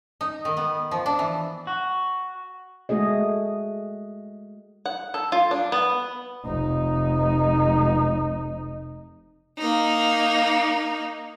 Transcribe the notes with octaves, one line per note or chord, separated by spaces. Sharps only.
D#4
D#3
B3
F3
D4
E3
F#4
G#3 A3 F#4 G#4 D#5
F#5
A4
F4
D4
B3
F1 D#4
A#3 D#4